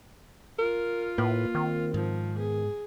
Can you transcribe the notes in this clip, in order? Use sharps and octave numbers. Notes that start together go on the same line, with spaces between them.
F4 A#4
A2 A#3 B4
D#3 C4
G#2 F3
B3 G#4